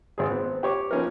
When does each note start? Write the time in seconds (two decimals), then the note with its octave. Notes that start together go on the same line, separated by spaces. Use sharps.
0.18 G#1 G#4
0.30 B3 C4
0.63 G4 C#5 D6
0.91 F3 B3 C#4 D#4 A#4